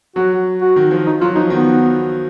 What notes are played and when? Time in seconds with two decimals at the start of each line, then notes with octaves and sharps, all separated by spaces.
0.16 F#3 F#4
0.61 F#4
0.76 D#3
0.91 F3
1.06 D#4
1.21 F#3 F4
1.35 F3 D#4
1.50 D#3 B3